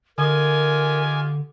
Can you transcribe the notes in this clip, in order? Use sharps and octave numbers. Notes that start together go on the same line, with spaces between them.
D3 F4 G4 A#4 D#5 G#5